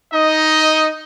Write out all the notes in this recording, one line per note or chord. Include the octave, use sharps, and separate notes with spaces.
D#4 D#5